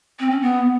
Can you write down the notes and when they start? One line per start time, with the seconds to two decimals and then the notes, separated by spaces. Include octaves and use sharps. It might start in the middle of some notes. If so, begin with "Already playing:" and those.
0.20 C4
0.31 C#4
0.42 B3